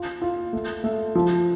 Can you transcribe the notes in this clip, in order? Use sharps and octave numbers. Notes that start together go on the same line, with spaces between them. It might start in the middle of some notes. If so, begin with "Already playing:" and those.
Already playing: F4
F4
A3
A3
F3